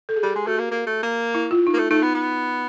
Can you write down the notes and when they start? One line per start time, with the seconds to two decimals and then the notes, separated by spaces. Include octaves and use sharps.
0.09 A4
0.16 G#4
0.23 G3 G4
0.36 G#3
0.47 A3 F#4
0.59 A#3
0.71 A#3
0.87 A3
1.03 A#3
1.35 E4
1.51 F4
1.67 D#4
1.74 A#3
1.78 A3
1.91 A3 D#4
2.02 B3
2.15 B3